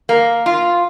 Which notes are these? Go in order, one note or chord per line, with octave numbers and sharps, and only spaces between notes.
A#3
F4